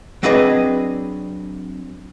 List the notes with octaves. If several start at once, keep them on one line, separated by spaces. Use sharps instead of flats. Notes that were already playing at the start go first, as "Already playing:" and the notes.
F#3 C4 D4 G#4 B4 D#5